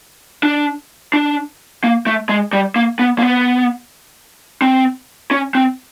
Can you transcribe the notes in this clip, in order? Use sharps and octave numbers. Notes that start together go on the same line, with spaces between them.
D4
D4
A#3
A3
G#3
G3
A#3
B3
A#3
B3
C4
C#4
C4